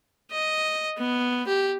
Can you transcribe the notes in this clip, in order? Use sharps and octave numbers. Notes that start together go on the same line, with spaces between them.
D#5
B3
G4